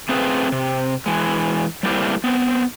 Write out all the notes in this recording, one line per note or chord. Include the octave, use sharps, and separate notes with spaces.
A3 C4 C#4 F4 G#4 B4
C3
E3 G#3
G3 A3 A#3 C4 E4 G4
B3 C4